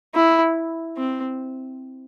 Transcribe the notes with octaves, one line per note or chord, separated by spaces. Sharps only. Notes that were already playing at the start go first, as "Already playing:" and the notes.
E4
C4